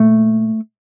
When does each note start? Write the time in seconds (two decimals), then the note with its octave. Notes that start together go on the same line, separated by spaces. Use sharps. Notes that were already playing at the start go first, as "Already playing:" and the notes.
Already playing: A#2 A3